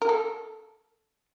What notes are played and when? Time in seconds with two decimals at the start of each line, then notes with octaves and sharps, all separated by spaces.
0.02 A#4
0.09 A4